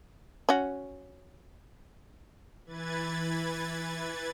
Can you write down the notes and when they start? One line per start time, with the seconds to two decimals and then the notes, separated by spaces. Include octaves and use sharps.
0.49 C#4 F#4
2.66 E3 B4 G#6 A6